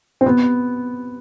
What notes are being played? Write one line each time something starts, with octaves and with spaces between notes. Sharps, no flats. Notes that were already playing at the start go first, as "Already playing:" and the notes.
C4
B3